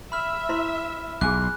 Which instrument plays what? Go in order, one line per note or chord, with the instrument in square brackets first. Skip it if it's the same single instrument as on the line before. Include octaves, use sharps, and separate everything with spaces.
[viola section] E5 [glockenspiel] B5 F6
[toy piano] E4 C5 C6
[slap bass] B1 [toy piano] G#4 G#5 D6 [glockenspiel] F#6